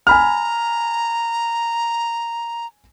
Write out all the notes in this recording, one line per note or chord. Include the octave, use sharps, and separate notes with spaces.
G#5 A#5 B5 F6